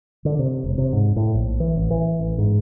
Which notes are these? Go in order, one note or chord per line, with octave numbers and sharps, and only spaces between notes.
D3
C3
E1
C3
G#2
A2
A#1
E3
A1
E3
A1
G#2